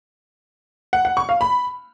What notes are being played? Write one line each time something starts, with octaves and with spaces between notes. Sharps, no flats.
F#5
F#5
C#6
F5
B5